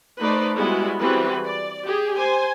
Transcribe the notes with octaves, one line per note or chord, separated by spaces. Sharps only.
A3 D#4 B4 C5 D5
G3 G#3 B3 E4 F#4
E3 G3 C4 F#4 G#4 B4
D5
G4 G#4
C5 G#5